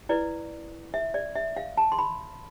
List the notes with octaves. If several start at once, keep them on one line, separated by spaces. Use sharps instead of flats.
E4 B4 D5
E5
D5
E5
F5
A5
C6
B5